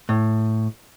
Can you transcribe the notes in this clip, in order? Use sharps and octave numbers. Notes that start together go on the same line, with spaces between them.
A2